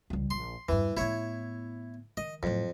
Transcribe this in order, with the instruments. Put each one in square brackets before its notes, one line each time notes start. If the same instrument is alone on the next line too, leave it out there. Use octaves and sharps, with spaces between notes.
[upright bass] C#2 G3
[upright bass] A#1 [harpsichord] C6
[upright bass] E2 G2 [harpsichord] E3
[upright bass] A2 B3 [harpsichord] E4 C#5
[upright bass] D#3 [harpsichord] D#5
[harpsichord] F2 [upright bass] A2 F#3